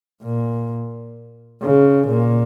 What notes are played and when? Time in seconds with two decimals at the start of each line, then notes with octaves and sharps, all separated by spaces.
0.23 A#2
1.62 C#3
2.08 A#2